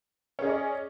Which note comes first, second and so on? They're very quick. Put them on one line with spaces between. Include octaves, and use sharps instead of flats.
C#4 G#4 D#5 D5